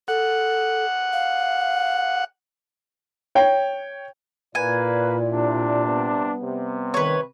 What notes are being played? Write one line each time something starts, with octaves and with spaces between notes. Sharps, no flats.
A4 F#5
F5
C#5 G5
A#2 A#3 E4 B4 D5 G#5
C3 D4
G3 B3
C3
D#3 B4 C#5